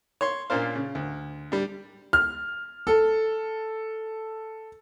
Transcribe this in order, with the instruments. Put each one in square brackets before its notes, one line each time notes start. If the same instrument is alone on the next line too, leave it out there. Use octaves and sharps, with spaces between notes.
[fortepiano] C#5 C6
A#2 A#3 C#4 D4 C5 F5
C#3
D2
G3 D4
[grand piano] F6
A4